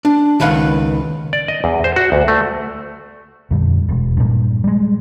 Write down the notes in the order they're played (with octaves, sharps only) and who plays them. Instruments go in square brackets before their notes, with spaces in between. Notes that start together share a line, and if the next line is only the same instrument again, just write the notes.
[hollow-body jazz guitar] D4
C#2 D#3 B4 F5 F#5
[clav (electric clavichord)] D5
D#5
E2
C5
F#4
D2
A3
[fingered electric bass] F2 A#2 D3 G3
E1
G2 A#2
G3 G#3